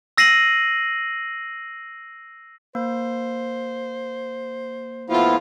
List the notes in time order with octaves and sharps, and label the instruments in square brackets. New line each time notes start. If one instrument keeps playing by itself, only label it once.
[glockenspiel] E6 A#6 C7 D#7 F#7
[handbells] A#3 [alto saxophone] C5
[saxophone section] A2 F3 F4 [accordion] B3 E4